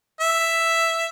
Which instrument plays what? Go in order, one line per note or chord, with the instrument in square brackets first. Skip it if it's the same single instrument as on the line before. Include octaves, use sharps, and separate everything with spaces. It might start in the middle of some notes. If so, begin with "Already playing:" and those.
[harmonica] E5